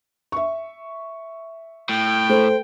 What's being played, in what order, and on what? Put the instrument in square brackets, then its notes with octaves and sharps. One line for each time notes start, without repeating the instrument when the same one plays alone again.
[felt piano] E5 C#6
[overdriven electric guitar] A2 [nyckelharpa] G5
[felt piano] A3 [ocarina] C5